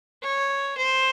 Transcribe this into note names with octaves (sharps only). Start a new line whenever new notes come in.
C#5
C5